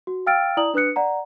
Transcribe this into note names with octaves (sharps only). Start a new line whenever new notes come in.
F#4
F5 G5 E6 F6 A6 D7
E4 D5 A#5 D#6 F#7
D4 B4 D#6 F#6 C#7
D5 F#5 A#5